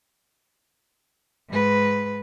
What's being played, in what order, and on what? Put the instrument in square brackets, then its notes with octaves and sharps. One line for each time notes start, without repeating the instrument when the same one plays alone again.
[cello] G#2 B4